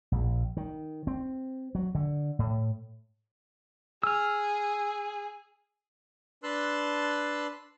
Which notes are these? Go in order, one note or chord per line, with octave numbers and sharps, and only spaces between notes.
A#1
D#3
C4
F#3
D3
A2
G#4 E6 F6
D4 B4 A5 C6 E6 F#6